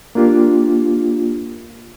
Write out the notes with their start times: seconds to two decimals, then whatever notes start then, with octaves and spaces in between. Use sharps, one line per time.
0.15 A#3 D4 F4 G4